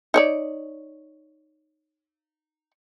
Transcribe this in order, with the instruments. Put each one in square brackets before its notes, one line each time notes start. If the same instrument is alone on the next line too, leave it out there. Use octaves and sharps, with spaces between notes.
[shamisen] D#4 C#5 D5